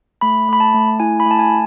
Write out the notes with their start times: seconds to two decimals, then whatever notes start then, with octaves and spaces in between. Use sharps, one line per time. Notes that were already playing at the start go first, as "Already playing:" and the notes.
0.21 A3 B5
0.48 A3 B5
0.60 A5
0.74 A3
1.00 E4 G#5
1.20 B5
1.26 A3
1.31 A5
1.39 G#5